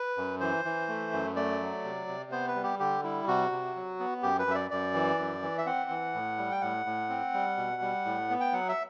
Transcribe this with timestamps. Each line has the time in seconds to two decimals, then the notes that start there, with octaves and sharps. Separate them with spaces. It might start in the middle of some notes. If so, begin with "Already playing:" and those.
Already playing: B4
0.17 F#2
0.40 E3 C5
0.65 E3
0.88 A3
1.13 F#2
1.36 A3 D5
1.61 F#3
1.84 C3
2.08 C3
2.31 B3 C5
2.48 B4
2.55 G3
2.63 G4
2.79 D3 G4
3.03 G3 E4
3.27 C3 F#4
3.52 C3
3.76 F#3
4.00 B3
4.23 F#2 G4
4.39 B4
4.47 F#2 E5
4.55 D5
4.71 F#2 D5
4.94 E3
5.19 F#2
5.42 E3
5.58 E5
5.66 C4 F#5
5.90 E3
6.14 A2
6.38 G3
6.51 G5
6.61 A2 F#5
6.86 A2
7.09 C4
7.34 G3
7.57 B2
7.82 G3
8.05 A2
8.30 B3
8.40 G5
8.52 F#3 F#5
8.69 E5